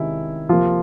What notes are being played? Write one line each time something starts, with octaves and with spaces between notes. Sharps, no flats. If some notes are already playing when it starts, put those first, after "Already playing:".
Already playing: C3 D#3 G#3 C#4 E4
C3 F3 A#3 F4